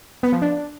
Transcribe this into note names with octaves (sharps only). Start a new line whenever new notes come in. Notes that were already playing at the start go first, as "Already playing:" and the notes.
B3
F3
D4